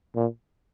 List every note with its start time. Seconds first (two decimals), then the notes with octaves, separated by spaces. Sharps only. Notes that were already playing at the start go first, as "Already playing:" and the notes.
0.15 A#2